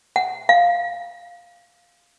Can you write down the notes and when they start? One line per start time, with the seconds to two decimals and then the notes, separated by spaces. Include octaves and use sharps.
0.16 F#5
0.49 F5